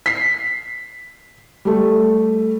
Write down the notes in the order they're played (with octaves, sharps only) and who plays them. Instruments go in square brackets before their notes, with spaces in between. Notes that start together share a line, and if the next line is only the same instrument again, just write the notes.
[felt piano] B6 C7
G3 A3